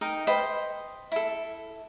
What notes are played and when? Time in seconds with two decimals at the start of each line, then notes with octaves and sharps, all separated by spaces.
0.01 D#4 A#4 D#5 G5
0.27 B4 C5 D#5 G5
1.12 E4 A4